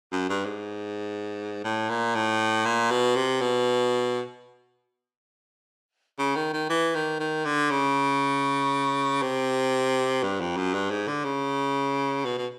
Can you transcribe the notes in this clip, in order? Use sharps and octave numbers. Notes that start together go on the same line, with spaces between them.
F#2
G2
G#2
A2
A#2
A2
A#2
B2
C3
B2
C#3
D#3
D#3
E3
D#3
D#3
D3
C#3
C3
G2
F2
F#2
G2
G#2
D3
C#3
B2
B2